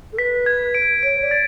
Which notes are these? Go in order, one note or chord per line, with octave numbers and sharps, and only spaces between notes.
A4
B4 B6
G#6
D7
C#5 D7
D5
A6